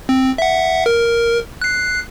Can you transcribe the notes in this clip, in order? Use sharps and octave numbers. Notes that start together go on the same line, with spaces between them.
C4
E5 F#5
A#4
F#6 C7